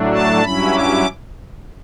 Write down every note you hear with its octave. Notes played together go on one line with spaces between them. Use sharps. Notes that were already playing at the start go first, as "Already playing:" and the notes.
Already playing: A2 F#3 A3 D4
A5
G2 F#3 C#4 E4 B5
D6